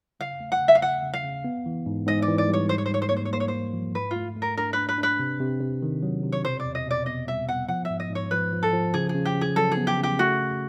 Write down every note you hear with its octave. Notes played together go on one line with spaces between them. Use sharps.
C#3 F5
A3
F#5
C#3
E5
F5
C#3 F#5
C#3
F5
C#3
B3
E3
G#2
G#2 D#5
D5
E3
D5
G3
C#5
G#2 C5
C#5
C5
G#2 C#5
C5
A#3 C#5
C5
C#5
A#3 C5
C#5
G#2 C5
F3
G#2 B4
F4
A3
A3
A#4
D4 A#4
D4 B4
B4
D4
B4
C3
C3
C3
D#3
F#3
C3
C#5
B2 C5
D5
E2
D#5
B2 D5
B3 D#5
G3 E5
B3 F#5
F3 F#5
E5
G#2
D#5
G#2
C#5
F3 B4
F3
A4
F3
C#3 G#4
G#4
C#3
G4
C#3
G#4
F#3 A4
G#4
B3
G4
C#3
G4
A3 F#4
A3